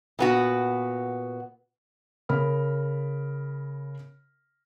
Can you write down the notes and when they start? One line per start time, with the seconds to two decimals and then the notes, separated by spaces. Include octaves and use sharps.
0.19 A#2 B3 F#4
2.29 C#3 A#4 B5 F6